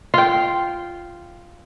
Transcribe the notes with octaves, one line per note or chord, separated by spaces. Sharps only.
F4 G5